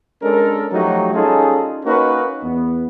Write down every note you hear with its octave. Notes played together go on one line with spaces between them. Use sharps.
G#3 C#4 D4 A4 A#4
F3 F#3 A3 D#4 F#4 G4
G3 C#4 D#4 F4 G#4 A4
A#3 C#4 D#4 F#4 A#4 B4
E2 B3